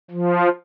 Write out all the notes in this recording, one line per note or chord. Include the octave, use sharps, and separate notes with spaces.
F3